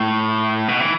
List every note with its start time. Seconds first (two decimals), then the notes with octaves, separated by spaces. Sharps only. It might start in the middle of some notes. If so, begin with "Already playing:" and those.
Already playing: A2
0.68 B2
0.80 E3